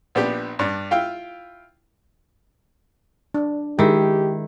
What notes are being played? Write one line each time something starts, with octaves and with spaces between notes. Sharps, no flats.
A#1 B3 D4 G4
G2 D4
E4 F4 F5 G5
D4
D#3 G#3 E4 G4